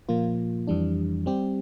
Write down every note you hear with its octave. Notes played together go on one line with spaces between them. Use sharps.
A#2 F3 A#3 F4
F2 E3 G3 D4
G3 C4 G4